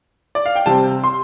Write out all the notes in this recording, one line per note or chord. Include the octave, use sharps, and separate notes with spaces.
D5
F5
G5
C3 G3 C4 A5
C6